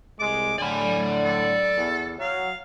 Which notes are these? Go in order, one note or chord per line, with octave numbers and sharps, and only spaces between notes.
C2 G#3 D6
A2 D3 D5 G#5 B5
A4
E2
F#3 F5